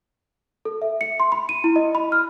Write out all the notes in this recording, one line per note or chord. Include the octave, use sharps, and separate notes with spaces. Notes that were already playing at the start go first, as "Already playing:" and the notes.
A4
E5
C#7
C6
B5
D#7
E4
D#5
B5
F6